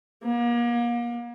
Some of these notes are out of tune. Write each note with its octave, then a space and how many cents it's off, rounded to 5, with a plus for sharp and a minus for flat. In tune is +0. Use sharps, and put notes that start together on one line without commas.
A#3 +35